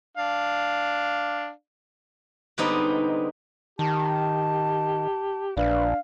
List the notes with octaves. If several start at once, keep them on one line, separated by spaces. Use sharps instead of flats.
D4 F5
D3 G3 G#3 B3 C4 D#4
D#3 G4 A5
A#1 D4 B4 F5